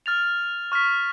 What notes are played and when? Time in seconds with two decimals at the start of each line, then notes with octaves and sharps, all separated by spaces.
0.06 F6 A6 F7
0.72 C#6 F6 B6